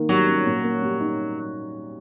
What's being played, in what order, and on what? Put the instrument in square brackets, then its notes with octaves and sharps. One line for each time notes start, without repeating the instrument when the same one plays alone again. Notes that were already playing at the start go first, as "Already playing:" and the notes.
Already playing: [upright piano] D#3 A#3
[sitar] F#3 [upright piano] G3
[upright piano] C#4
A#2
A#3
G3
D#4